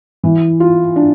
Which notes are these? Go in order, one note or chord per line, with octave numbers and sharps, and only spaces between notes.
E3
F4
D4